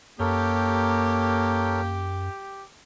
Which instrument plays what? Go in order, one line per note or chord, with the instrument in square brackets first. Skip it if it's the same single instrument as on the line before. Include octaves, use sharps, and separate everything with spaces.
[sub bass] F#2 [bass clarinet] A#3 [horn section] G4 [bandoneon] A4 A#4 C#5